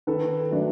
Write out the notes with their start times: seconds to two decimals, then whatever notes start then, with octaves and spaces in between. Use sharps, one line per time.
0.07 D#3 A4 B4
0.51 F#3 A3 D4